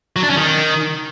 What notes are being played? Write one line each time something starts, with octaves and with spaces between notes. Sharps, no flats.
F#3
D4
C#4
D#3